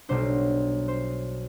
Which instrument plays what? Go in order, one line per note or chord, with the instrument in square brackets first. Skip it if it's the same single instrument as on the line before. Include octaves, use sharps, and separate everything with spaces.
[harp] B1 B2 G3 D4 C5
C5